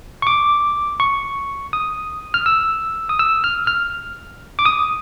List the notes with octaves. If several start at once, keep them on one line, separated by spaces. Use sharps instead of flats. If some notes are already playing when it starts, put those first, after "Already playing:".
C#6
D6
C#6
D#6
F6
E6
D#6
E6
F6
F6
D6
D#6